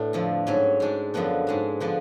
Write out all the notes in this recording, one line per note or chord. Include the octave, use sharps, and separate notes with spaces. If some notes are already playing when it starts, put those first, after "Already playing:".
Already playing: A2 B3 D4
F2 D3 F3
G#2 F#3 C#4
G#2 G#3 D4
F#2 D3 F3 B3 D4
G#2 G#3 D4
D3 F3 B3 D4